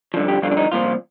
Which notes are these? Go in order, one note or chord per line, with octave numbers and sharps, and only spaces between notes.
G2 D3 F3
G4
G2 D3 F3 F4
D4
D#4
C2 A#2 F3 F4